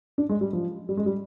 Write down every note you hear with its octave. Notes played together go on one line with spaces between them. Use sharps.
D4
G#3
G3
F3
G3
G#3
G3